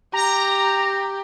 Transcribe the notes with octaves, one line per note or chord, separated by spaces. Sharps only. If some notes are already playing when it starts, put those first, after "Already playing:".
G4 A#5